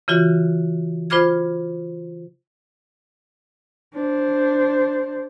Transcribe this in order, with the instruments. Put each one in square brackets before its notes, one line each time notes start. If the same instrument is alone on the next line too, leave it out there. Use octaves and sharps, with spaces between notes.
[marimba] C#3 E3 F4 F#4
F4 C5 B5 D6 F6 G#6
[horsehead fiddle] D4 C5